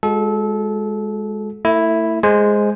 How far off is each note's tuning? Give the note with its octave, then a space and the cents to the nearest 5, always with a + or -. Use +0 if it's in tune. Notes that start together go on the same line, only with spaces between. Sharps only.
G#3 +0 F#4 -35 A4 -25
A3 +35 E4 +0
G#3 +0 C5 +0 G#5 +0